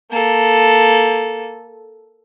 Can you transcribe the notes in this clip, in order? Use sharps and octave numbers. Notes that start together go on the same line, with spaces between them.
A#3 A4